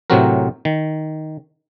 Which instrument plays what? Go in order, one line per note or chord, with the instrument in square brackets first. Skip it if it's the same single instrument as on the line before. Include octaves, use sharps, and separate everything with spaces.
[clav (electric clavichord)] A2 C3 F#3 C4 F#4 A#4
D#3